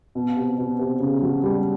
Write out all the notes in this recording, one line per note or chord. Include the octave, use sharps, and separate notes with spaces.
B2
C3
B2
C3
C#3
F#3
G3